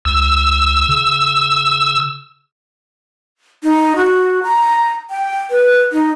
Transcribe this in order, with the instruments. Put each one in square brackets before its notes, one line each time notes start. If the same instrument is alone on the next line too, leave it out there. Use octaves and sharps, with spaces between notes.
[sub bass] C#2 [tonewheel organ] E6
[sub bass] C#3
[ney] D#4
F#4
A#5
G5
B4
D#4